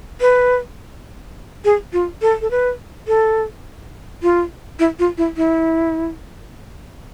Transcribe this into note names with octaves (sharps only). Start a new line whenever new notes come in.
B4
G#4
F4
A4
A4
B4
A4
F4
E4
F4
E4
E4